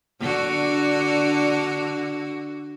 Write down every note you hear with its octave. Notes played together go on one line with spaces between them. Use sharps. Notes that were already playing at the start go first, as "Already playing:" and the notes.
D3 D4 F#4